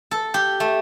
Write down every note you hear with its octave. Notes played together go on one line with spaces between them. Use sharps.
A4
G4
A3